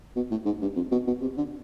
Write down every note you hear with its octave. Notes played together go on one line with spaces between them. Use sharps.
B2
A2
G#2
G2
F2
B2
B2
C3
D3